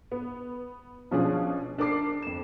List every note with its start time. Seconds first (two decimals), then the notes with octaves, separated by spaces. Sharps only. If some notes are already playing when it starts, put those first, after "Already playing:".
0.12 B3
1.11 B2 F3 C#4 D4 F4 G#4
1.78 D4 A#4 D6 C7
2.22 F2 E7